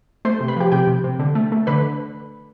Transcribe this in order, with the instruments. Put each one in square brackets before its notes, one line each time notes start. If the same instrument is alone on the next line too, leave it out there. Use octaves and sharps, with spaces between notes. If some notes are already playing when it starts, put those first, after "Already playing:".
[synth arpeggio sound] A3 C5 C6
C3
B4 B5
F3 G4 G5
C3 G4 G5
C3
C3
D3
A3
A3
D3 B4 B5